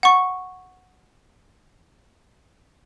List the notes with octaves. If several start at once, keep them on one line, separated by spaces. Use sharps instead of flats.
F#5 C#6